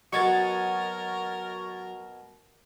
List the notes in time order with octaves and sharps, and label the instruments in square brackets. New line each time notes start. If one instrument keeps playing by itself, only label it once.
[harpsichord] B2 F#4 [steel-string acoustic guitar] F#3 D#5 [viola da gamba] A#4 [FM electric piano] C#6 G#6 A6